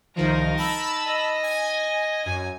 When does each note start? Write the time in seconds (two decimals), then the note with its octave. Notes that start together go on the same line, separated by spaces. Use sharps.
0.16 C2 D#3 F3 D#4 A#4
0.57 A5 B5 E6
1.05 D#5
1.43 G#5
2.26 F#2 G#5